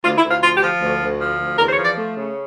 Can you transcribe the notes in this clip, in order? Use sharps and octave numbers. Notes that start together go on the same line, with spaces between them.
D2 F4
E4
D2
F4
F3 F4
G4
F3
D2
D2
F3
D2
E2 A#4
C5
C#5
F3
D5
A3
C#3